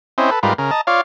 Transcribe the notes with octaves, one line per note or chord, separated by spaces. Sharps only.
C4 C#4 E4 C5 D#5
A4 B4
G#2 G3 F4 A#4 B4
C#3 A#4
D#5 A5 A#5
F4 C#5 D5 F5